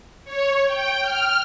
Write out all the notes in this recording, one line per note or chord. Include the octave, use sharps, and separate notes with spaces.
C#5
G5
F6